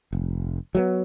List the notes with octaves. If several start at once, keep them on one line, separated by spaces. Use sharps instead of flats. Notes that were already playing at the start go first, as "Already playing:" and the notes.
F1
F#3 G#3 B3